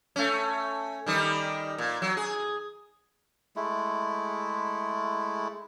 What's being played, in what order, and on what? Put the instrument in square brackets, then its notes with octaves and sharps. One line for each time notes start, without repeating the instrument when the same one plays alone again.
[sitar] A3 C#4
D#3 G3 D#4
A#2
F#3
G#4
[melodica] G#3 A3 E4